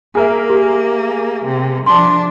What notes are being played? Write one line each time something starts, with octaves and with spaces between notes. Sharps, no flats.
A#3 G#4 A#4 E5
G4
C3
F3 D4 A5 C6